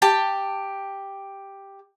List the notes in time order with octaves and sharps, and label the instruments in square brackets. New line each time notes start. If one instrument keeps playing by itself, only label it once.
[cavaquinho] G4 G5 A5